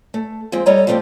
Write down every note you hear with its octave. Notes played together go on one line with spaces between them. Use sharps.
A3
F3 G#3 C4
G3 A4 C#5 D#5 A#5
F3 G3 A3 A#3 C4 G4